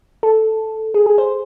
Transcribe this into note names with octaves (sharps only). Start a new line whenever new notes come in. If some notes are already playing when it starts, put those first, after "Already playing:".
A4
G#4
G#4
C5